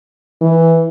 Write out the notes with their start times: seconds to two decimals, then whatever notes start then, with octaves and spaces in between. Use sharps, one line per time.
0.42 E3